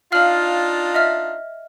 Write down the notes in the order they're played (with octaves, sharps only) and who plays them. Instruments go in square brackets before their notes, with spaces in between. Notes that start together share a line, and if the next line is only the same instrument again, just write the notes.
[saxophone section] D4 D#4 F4 [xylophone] F5 F6 F#7
[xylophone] D#5 E5 F6